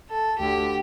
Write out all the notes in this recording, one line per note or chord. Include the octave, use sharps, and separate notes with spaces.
A4
D2 D3 G4